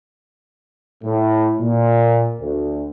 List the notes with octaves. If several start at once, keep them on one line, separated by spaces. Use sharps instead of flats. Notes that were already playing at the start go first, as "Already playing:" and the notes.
A2
A#2
D2